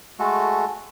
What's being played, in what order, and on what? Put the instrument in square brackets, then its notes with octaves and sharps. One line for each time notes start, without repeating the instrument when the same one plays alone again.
[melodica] G#3 A3 F#4 A4